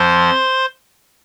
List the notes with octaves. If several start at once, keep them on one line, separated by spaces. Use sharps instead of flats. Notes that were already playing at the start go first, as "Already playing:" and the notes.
Already playing: F2 F3 C5 C6